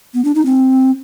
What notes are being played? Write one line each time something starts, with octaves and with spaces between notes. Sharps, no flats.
B3
D4
D#4
C4